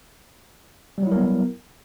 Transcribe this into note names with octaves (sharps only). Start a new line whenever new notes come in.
F#3 G3 B3 E4 A#4